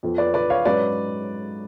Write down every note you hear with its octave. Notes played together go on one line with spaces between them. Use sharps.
F2 F3 B3
B4 D5
B4 D5
C#5 F5
G#2 F#3 C#4 B4 D5